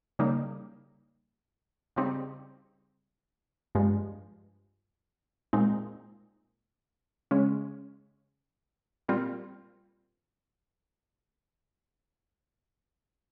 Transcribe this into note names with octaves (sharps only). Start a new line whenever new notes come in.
C#3 G3 A#3 D#4
C#3 G3 C4 D#4
G2 F3 G#3
A#2 G#3 C4 D#4
C#3 G#3 C#4
A#2 G3 C4 F4